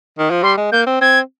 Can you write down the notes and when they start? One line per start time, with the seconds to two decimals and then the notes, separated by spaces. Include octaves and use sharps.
0.18 D#3
0.30 F3
0.43 G3 C6
0.57 G#3
0.72 A#3 G6
0.87 C4
1.01 C4 G#6